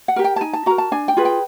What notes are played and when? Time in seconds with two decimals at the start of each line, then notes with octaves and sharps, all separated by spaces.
0.08 F#5
0.16 G4 A#4
0.24 G5
0.36 A5
0.41 D#4 G#5
0.53 A5
0.66 F#4 A#4 A#5
0.78 A5
0.92 D4 G#5
1.08 G5
1.17 F4 G#4 B4
1.25 G5